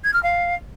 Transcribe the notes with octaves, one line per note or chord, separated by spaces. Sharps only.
G#6
F6
F5